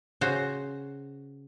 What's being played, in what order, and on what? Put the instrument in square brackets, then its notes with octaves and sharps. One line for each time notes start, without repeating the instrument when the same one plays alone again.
[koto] C#3 F#4 C5